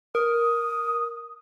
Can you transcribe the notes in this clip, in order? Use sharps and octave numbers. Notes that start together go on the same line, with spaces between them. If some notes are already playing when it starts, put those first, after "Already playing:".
A#4 D#6